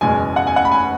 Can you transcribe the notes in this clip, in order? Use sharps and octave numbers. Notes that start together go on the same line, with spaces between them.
F#1 E2 B2 G#3 G#5
F#5
G#5
F#5
B5
G#5